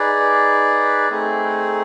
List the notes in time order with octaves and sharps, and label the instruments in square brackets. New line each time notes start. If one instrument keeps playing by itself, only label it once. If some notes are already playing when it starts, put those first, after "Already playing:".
Already playing: [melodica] D#4 G#4 B4 D5
A3 C4 D#4 G#4